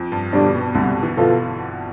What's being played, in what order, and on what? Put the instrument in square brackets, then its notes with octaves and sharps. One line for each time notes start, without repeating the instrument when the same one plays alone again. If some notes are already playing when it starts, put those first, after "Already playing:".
Already playing: [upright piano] F2
G2
[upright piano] B2 [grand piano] D3 G3 D4
[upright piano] B2
[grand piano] C2 [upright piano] D3
[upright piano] E3
[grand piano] B2 B3 F4 A4